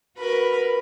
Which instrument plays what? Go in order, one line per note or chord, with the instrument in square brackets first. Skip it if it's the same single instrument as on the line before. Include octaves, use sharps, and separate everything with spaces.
[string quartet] F#4 A#4 B4 B5